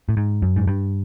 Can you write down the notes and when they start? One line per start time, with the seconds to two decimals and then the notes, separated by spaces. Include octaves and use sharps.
0.09 A2
0.17 G#2
0.42 F#2
0.56 G#2
0.67 G2